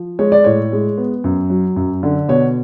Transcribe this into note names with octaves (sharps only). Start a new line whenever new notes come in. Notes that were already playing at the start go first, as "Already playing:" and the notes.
Already playing: F3
G#3 C#5
D5
A2 C#5
G#3
B3
F#2
F#3
F#2
D3
B2 C#5